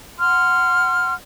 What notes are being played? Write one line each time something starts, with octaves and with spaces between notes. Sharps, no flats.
F#5 C6 F6